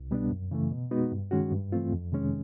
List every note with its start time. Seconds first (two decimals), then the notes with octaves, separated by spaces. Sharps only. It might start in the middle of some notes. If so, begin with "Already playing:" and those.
Already playing: C2
0.11 B2 G3 B3 D4
0.30 F#2
0.51 C#3 E3 A3
0.71 B2
0.91 G#3 B3 D#4 F#4
1.12 G2
1.31 D#3 G#3 C#4 F#4
1.52 G2
1.72 E3 A3 C4 F4
1.92 F2
2.12 C3 D#3 G#3 C#4